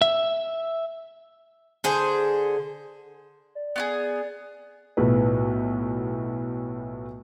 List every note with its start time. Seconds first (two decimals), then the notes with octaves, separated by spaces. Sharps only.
0.02 E5
1.84 D3 G#4 C5
3.55 D5
3.76 B3 F4 G#4
4.97 B1 A2 F3 B4